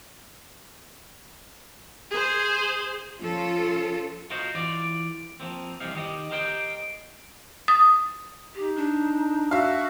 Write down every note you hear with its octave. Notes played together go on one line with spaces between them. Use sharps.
G#4 C5
F3 C#4 F4 A4
F4 F#4 A#4 C5 D#5
E3 F4 D5
F3 F#3 A#3 C4
C2 C3 E3 D#4 F5
D#3 D#4 G4 D#5
G4 A#4 C5 D#5 F#5 G5
D#6
D#4 G4
D4
F#4 E5 F5